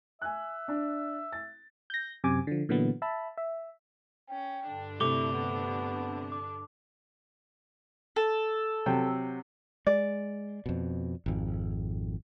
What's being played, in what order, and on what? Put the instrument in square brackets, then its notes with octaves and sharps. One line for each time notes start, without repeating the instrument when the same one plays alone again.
[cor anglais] E5 [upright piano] G#5 F#6
[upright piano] D4
A6
[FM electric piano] G6 A#6
F#2 C3 G#5 D6
D3 F3
A#2 D3 E3 F#3 B3
E5 A5 B5
E5
[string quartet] C#4 [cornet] G5
[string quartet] G2 D3 D4
[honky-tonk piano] C3 A3 [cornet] E4 [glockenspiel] D6 F7 G7
[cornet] B3
[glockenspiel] D6
[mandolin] A4
[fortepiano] C3 F#3 G5
[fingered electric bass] G#3 [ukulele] D5
[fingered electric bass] F2 B2
G#1 F2